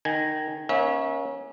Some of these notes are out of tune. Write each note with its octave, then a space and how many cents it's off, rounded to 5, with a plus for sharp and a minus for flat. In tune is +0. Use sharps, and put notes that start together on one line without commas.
D#3 -15 G#5 -5
A#3 +40 C#4 +0 E5 -30